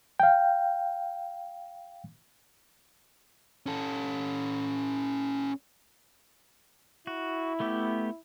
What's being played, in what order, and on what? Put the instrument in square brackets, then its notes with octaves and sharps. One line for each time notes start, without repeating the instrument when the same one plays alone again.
[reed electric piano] F5 G5
[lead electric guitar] C#4 A4
[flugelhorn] E4 [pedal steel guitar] F#4
[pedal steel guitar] A3 B3 G4